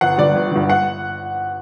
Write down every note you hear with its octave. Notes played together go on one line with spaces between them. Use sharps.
G1 F#5
G2 D3 D5
G1
G2 D3
F#5